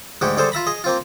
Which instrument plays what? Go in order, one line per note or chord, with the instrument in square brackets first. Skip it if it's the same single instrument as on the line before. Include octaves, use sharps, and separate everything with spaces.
[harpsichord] D2 G#2 G#3 F#4 G4
D3 G3 G#4 A4 C5
F4 E5 A#5 B5
G#4 D#5
A#3 C4 F4